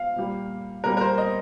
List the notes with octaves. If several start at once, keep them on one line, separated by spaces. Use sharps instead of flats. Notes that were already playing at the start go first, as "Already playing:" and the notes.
Already playing: F5
A#2 G3 A#3
A#2 G3 A#3 A#4
A#4
C5
D#5